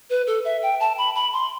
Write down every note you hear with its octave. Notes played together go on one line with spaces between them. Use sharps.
B4
A4
E5
G5
A5
B5
B5
C6